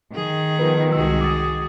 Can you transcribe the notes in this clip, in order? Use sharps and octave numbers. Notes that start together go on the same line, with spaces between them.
D#3 G#4
F3 B3 F4 A#4 B4
C2 G#3 F#4 G#4 E6
D6 D#6 A6